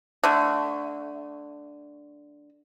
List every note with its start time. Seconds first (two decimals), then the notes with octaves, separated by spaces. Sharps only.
0.24 D3 A3